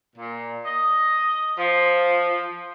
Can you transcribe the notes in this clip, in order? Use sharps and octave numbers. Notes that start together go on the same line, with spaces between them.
A#2
D#5
F3